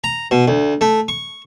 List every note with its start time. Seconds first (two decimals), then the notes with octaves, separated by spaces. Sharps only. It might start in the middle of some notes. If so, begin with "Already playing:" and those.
0.04 A#5
0.31 B2
0.48 D2
0.81 A3
1.08 C#6